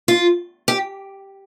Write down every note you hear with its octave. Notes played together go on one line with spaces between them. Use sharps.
F4
G4